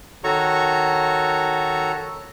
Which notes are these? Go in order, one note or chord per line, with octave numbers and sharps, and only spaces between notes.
D#3 F#4 A4 C#5 A#5 C#6